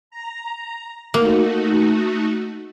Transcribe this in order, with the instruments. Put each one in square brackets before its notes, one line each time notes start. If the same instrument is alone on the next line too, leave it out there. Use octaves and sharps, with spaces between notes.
[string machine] A#5
[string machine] A3 D#4 F#4 [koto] A#3